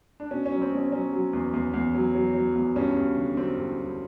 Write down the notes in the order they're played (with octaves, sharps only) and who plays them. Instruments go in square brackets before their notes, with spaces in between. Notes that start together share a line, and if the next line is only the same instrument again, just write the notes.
[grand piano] D4
B2 C#4
C#4
F#3
C4
B2 C#4
F#3 C#4
F#3
E2
E2
E2
F#3
F#3
F#3
E2
G2 C#4
G2
D3
F#3 C4
G2
G2